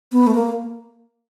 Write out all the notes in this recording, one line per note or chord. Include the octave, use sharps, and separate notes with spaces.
B3
A3
A#3